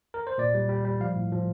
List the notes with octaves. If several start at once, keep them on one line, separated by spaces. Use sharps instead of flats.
A#4
C5
A#2 D5
G3
G3
G3
F3 F5
A2
F3